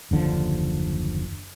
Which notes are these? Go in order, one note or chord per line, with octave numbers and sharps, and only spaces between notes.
F#1 D#2 D3 F3